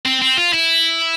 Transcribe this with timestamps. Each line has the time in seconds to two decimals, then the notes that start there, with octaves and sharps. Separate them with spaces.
0.06 C4
0.22 C4
0.38 F4
0.53 E4